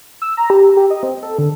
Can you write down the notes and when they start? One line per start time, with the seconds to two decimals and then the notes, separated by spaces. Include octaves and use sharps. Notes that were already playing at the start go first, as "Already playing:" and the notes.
0.22 E6
0.37 A#5
0.50 G4
0.77 G4
0.90 D#5
1.03 C4
1.23 A4
1.38 D3